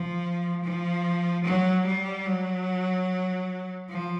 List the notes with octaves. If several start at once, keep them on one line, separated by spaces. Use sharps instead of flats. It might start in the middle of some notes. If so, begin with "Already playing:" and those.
Already playing: F3
F3
F#3
G3
F#3
F3